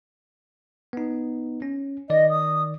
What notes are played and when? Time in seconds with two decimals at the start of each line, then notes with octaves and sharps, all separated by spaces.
0.93 B3 D#4
1.62 C#4
2.10 D#3 D5 D#5
2.30 D#6